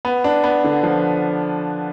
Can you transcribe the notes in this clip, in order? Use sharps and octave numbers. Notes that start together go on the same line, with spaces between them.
B3
D4
B3
D3
F3